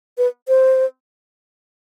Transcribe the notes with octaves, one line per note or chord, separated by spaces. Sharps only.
B4
C5